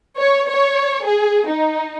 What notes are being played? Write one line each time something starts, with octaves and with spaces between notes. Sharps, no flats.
C#5
C#5
G#4
D#4